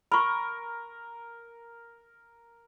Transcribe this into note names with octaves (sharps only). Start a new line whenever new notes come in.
A#4 B5 C#6